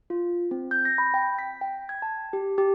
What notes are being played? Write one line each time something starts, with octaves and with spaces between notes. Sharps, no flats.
F4
C4
G6
A#6
B5
G5
B6
G5
G#6
A5
G4
G4